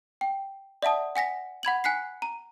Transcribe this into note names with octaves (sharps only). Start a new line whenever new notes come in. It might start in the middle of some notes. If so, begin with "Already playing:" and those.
G5
D5 E5 F#5 A5 D#6
F#5 G#5 A#6 B6
F#5 B5 G#6 F#7
G#5 F#6 B6 C7
A#5